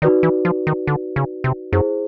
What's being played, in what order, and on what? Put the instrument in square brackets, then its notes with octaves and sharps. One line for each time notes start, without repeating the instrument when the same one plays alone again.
[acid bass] D#3 [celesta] D#4 F#4 B4 D5
[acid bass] E3
F3
D#3
D3
C#3
C3
[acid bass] F#2 [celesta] E4 G#4 C5